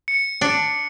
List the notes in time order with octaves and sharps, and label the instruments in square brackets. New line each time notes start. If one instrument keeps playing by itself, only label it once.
[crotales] C#7
[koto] D4